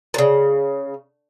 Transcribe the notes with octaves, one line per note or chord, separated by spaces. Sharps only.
A#2 C#3